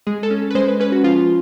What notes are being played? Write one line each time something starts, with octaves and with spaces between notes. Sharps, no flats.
G#3 G#4
A4
C#4
B4
G#3 C5
B4
C#4 B4
F#4
F3 F4